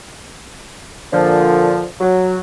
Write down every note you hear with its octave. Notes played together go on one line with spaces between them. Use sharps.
A#2 D3 F3
F#3